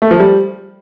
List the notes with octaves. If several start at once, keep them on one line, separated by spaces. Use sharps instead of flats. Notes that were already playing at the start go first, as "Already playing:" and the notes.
A3
F3
G3